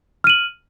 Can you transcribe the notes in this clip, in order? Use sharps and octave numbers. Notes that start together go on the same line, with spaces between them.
F6 D#7 F#7